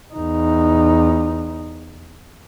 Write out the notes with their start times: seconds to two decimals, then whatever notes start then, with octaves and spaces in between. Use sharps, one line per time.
0.14 E2 D#4